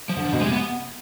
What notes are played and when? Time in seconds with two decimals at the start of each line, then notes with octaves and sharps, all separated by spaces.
0.09 F3
0.17 D3
0.25 F3
0.33 B2
0.40 C3 G#3
0.52 B3